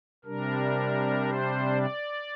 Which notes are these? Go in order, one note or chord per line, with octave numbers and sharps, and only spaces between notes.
C3 G3 D4 A#4
C5
D5